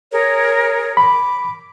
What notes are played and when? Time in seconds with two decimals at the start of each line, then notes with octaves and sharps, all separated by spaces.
0.12 G#4 A#4 C#5
0.97 B5 D6